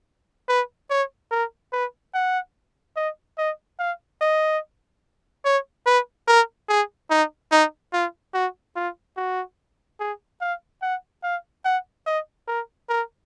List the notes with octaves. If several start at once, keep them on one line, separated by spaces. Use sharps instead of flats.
B4
C#5
A#4
B4
F#5
D#5
D#5
F5
D#5
C#5
B4
A#4
G#4
D#4
D#4
F4
F#4
F4
F#4
G#4
F5
F#5
F5
F#5
D#5
A#4
A#4